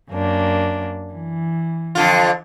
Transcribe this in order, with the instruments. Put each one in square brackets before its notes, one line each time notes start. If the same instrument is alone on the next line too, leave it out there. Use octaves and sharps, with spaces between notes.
[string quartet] F#2 A#3 D4
E3
[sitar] F2 D3 F4